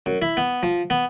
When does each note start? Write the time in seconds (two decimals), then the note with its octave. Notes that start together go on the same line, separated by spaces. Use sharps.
0.06 F#2
0.22 E4
0.37 B3
0.63 F3
0.90 B3